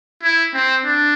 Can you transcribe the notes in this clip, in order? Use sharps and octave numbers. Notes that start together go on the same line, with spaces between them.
E4
C4
D4